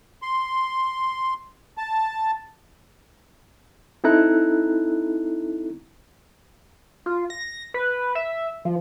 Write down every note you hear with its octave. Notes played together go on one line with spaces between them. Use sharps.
C6
A5
C4 D#4 E4 A4 A#5 F#6
F4
A#6
B4
E5
F3